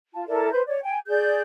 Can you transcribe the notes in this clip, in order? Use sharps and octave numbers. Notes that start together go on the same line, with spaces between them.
F4 A5
E4 A4 A#4 D5
B4 C5 G6
C#5 D5
G5 G#5
G#4 D5 G6